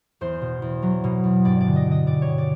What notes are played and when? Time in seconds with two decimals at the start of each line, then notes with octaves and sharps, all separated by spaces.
0.21 E2 C5
0.41 B2
0.62 E2
0.83 F#3
1.04 B2
1.24 E2
1.45 G2 D5
1.61 D5
1.66 D3
1.76 D#5
1.86 D3
1.91 D#5
2.07 G2 D5
2.22 C#5
2.27 D3
2.38 D5